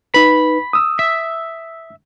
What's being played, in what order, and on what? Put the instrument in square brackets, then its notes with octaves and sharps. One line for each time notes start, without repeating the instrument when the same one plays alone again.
[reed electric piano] D#4 B4 [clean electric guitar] B5
[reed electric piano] D#6 E6
[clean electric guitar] E5